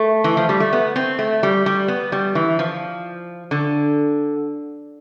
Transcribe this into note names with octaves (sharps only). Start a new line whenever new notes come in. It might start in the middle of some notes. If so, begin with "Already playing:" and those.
Already playing: A3
E3
F3
G3
A3
B3
C4
A3
G3
G3
B3
G3
E3
F3
D3